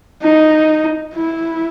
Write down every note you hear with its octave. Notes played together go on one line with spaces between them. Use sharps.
D#4
E4